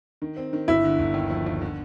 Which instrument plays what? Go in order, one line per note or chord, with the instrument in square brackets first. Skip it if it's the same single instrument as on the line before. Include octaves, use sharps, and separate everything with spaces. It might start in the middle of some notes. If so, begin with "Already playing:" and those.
[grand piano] D#3
C4
D#3
[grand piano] G1 [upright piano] E4
[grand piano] D3
G1
D#2
F3
D#2
D3